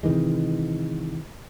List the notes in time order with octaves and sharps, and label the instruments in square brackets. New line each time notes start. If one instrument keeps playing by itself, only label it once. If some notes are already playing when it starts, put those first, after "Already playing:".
[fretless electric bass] C3 D#3 E3 G#3